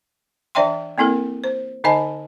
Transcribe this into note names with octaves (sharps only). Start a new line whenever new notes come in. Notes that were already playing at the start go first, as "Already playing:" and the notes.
E3 D4 D5 E5 G5 C6
A#3 C4 E4 A4 A#4
C5
D3 D#4 C5 D#5 G#5 A5